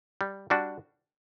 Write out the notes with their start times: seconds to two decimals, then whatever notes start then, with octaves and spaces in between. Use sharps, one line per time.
0.21 G3
0.50 G3 D4 F#4